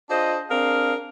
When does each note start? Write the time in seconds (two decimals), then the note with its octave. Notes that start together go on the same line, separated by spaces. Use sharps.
0.10 D4 F4 G#4 C5 D#5
0.49 C4 D4 G#4 A#4 F5